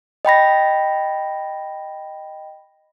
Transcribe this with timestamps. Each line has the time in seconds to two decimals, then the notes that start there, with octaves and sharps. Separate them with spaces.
0.25 D#5 G5 B5 A#6